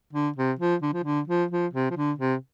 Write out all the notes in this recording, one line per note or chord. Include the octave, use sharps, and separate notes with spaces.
D3
C3
F3
D3
F3
D3
F3
F3
C3
F3
D3
C3